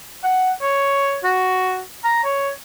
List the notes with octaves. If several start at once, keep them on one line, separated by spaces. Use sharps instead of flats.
F#5
C#5
F#4
A#5
C#5